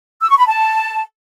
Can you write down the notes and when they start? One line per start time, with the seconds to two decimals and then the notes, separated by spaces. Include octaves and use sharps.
0.21 E6
0.30 C#6
0.38 B5
0.46 A5